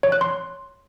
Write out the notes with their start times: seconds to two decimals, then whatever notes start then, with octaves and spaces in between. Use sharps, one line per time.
0.03 C#5
0.12 F#6
0.21 C6